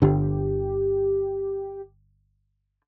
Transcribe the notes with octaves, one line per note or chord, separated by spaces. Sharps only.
G1 D3 G4